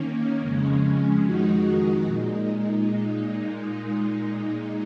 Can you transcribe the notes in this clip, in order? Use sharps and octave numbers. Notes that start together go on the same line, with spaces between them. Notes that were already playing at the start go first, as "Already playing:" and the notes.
Already playing: D#3 A#3 C#4
F2 C#3 G#3 C#4
F2 D#3 G#3 D#4 F#4
A#2 G#3 D#4